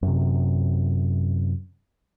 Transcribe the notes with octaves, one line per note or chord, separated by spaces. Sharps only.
F#2 C3